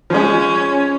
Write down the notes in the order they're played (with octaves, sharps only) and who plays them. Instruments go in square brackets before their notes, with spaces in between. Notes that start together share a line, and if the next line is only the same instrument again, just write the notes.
[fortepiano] F3 G#3 [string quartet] C#4